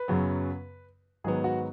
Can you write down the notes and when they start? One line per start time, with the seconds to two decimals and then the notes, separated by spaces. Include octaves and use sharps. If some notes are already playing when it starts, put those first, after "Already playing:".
Already playing: B4
0.08 F#2 C#3 F#3 B3
1.24 G#2 D#3 F#3 B3 G#4
1.44 F#4